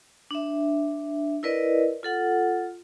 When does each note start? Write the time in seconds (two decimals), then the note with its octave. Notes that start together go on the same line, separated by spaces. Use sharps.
0.31 D4 E5
1.43 E4 A#4 B4 D5 D#5
2.03 F4 A4 F#5